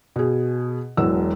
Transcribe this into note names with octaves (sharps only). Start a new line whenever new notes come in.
B2 G#4
E1 E2 F#3 E6